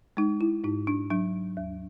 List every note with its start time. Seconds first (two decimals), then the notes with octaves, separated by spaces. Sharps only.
0.17 G#3 D#4
0.41 E4
0.64 G#2 D#4
0.87 D4
1.11 F#3 D4
1.57 D#2